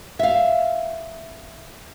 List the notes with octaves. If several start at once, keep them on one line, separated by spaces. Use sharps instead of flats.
E5 F5